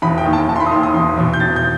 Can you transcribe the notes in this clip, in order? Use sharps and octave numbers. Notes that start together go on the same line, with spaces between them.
E1 B5
G5
D#2 D#3
A5
E1 A5
C6
B5
D#6
D#2 D#3 C6
D#6
E1 C6
E2 B2
G6
E1 A6
G6